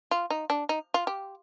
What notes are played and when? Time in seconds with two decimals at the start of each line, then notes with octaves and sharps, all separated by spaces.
0.11 F4
0.30 D#4
0.50 D4
0.69 D#4
0.94 F4
1.07 G4